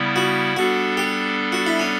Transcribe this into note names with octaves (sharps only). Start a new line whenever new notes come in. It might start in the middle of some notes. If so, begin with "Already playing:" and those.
Already playing: C#3 G3 B3 E4
F#4
G3 B3 D4 F#4 A4
G4
F#4
E4
C#4